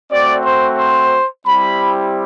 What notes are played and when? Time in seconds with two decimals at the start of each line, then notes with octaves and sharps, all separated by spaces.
0.11 A3 C4 F#4 D5
0.44 C5
0.79 C5
1.46 G3 C4 E4 G4 B5